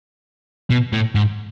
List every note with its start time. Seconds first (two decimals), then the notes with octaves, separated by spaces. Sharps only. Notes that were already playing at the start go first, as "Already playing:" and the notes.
0.70 B2
0.93 A2
1.15 G#2